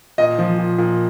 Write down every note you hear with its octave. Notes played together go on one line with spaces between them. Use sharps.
A#2 D#5
F3
A#2
A#2